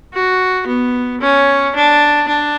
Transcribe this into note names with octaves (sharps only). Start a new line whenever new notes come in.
F#4
B3
C#4
D4
D4